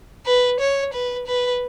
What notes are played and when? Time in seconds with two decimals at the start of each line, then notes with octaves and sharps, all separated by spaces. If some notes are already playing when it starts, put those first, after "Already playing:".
0.26 B4
0.60 C#5
0.93 B4
1.27 B4